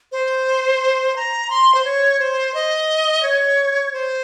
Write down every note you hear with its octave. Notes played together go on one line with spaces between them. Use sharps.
C5
A#5
C6
C5
C#5
C5
D#5
C#5
C5